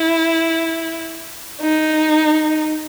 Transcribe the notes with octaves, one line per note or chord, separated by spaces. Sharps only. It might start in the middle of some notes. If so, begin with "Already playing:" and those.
Already playing: E4
D#4